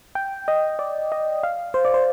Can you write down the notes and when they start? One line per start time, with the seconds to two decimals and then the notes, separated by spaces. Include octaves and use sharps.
0.15 G5
0.48 D#5
0.79 D5
1.12 D#5
1.43 F5
1.74 C5
1.85 D5
1.94 C5